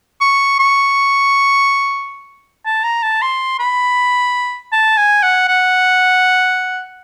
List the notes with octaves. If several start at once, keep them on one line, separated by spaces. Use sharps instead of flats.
C#6
C#6
A5
A#5
A5
C6
B5
A5
G#5
F#5
F#5